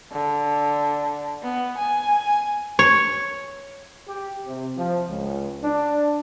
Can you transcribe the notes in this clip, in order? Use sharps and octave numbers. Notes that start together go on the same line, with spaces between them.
D3
B3
G#5
C#5
G4
C3
F3
C#2
D4